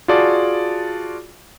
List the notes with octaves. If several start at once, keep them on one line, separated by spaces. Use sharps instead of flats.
F4 F#4 G#4 D5 A5 D6